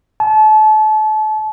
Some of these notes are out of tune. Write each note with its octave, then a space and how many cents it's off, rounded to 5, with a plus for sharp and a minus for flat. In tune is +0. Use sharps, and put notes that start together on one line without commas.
A5 -35